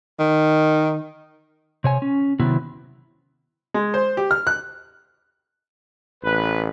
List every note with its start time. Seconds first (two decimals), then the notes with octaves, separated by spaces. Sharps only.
0.19 D#3
1.84 C3 C#5 G#5
2.02 C#4
2.40 C3 D#3 F#3 B3 E4
3.74 G#3
3.94 C5
4.17 G4
4.31 F6
4.47 F#6
6.23 A1 B4